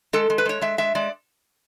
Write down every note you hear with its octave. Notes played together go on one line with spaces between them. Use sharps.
G#3 A4
G#3
B4
G#3 C#5
G#3 E5
G#3 E5
G#3 D5